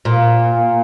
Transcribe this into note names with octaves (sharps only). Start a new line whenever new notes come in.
A#2